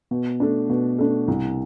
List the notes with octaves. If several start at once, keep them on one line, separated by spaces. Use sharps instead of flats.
B2
A3 D4
B2
A3 D4
C2